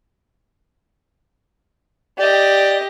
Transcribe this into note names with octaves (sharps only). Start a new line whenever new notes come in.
G4 D5 D#5